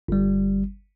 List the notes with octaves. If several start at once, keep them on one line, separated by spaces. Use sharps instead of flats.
G1 G3